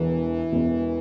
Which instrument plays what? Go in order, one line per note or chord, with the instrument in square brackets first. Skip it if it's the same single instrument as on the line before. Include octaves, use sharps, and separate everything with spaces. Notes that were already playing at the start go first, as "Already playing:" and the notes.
Already playing: [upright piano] E1 E2 B2 [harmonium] E3
[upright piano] E1 E2 B2